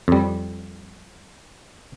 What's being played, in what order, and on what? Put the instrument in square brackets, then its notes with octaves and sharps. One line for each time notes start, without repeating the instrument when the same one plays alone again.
[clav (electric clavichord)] F2 G3